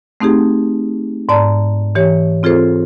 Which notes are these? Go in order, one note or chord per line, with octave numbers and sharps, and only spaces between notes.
A3 C4 D#4 G4 G#4
G#2 D5 A5 A#5
E3 G4 C#5
C4 F4 G#4 A4 C5